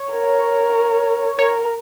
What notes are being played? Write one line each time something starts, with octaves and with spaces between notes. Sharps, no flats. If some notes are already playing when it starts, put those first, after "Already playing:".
Already playing: C#5
A#4
A#4 C#5